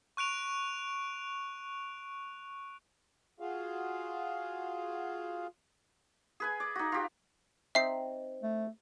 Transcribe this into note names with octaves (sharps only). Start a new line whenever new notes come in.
C#6 F#6 D7 F7
F4 F#4 G#4 F5
G#4 B4 G#5
D5
D#4 F#4
F4 G4
C4 D#4 E5 C7
A3